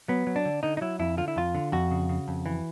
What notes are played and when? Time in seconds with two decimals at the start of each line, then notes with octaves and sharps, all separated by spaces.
0.08 F#3 B3
0.27 F#3
0.36 D4
0.45 D3
0.63 D3 D#4
0.77 D#4
0.81 F#3 E4
0.99 F2 E4
1.17 D3 F4
1.28 E4
1.36 F2 F4
1.55 D3
1.72 F2 F#4
1.91 C#3
2.09 C#3
2.28 F2
2.46 E3